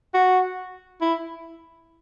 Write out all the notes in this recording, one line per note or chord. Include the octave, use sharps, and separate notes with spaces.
F#4
E4